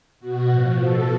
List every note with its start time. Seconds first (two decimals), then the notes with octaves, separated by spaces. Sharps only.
0.20 B2 F#4
0.49 A2 F3
0.78 B2 A4